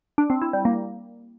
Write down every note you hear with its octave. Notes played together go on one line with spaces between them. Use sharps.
D4
C4
E4
G3
A#3